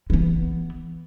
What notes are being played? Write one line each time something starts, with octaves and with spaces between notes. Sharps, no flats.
E3 B3